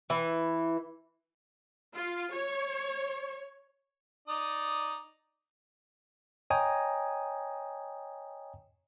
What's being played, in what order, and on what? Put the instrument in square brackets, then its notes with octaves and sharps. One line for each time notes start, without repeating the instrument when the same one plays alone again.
[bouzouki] E3
[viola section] F4
C#5
[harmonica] D#4 D5 D#6
[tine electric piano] C#5 D#5 G5 G#5 A#5 D#6